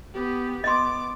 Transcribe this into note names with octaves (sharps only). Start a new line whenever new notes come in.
B3 G4
B3 D#5 C6 D6